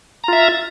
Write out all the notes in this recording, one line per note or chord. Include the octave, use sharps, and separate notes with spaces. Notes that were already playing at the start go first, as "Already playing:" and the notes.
F4 E5 A#5